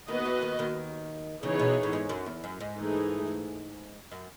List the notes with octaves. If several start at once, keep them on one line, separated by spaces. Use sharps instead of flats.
D#2 D#3 B3 F#4 B4 D#5
E2 E3
D#2 D#3
D#2 D#3
C#3 E3 B3 D#4 G#4 C#5
B2
A2
G#2
F#2
E2
F#2
G#2
E3 A3 D#4 G#4
F#2